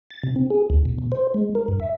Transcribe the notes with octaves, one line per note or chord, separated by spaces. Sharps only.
A6
C3
C4
G#4
D2
B2
B2
C5
G#3
A#4
G2
E5